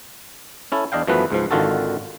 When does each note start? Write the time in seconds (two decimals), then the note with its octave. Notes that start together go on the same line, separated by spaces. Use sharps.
0.72 C#4 E4 A4
0.92 E2 D4 D#5 F5 G5
1.07 F#2 E3 F3 A3 B3 B4
1.30 C#2 G#2 F3
1.51 G#1 D3 D#3 F4 F#4 A4